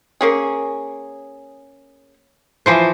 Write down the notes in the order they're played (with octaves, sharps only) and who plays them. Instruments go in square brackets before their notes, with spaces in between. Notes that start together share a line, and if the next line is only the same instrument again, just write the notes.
[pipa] A#3 C#4 G#4
[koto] E3 F3 C5